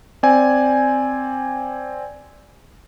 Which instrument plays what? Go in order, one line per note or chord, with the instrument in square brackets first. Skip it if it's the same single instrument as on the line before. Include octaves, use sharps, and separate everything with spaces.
[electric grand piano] C4 D5 G#5